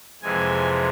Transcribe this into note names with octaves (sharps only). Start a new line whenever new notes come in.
F2 C3 E3 G#3 G#5